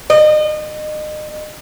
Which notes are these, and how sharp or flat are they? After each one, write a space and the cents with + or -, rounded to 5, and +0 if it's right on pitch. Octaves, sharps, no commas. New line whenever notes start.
D#5 -30